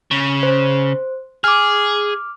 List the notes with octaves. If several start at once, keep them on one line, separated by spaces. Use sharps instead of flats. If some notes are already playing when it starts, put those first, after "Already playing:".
C#3
C5
G#4 D6 F6